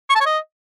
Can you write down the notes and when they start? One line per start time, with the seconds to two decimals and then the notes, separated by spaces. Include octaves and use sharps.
0.10 C#6
0.15 A5
0.20 C#5
0.26 D#5